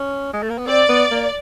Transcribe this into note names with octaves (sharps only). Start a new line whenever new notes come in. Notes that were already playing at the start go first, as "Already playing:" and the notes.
Already playing: C#4
G#3
A3
A#3
B3
C4 D5
B3
A#3